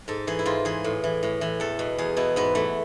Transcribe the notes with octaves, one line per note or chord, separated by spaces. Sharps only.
G#2 A4
E3 G#4
E4
G#2 F4
E3 G#4
A2
E3
A2
E3
E2 A4
B2
E2 G#4
B2 E4
G#2 B3
E3 A3